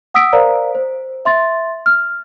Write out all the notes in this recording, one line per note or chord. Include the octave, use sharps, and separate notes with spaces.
F#5 D#6 E6 B6 D7
A#4 C5 D5 F5 A#5
C5
E5 C6 A6
F6